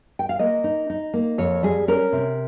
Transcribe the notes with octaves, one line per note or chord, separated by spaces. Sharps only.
G5
F5
A#3 D#5
D#4
D#4
A#3
F2 C#5
G3 G#4
C#4 A#4
C3